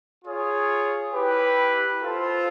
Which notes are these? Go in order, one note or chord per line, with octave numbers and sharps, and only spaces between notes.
F4 G#4 C#5
E4 G4 B4
F4 A4 C5 F5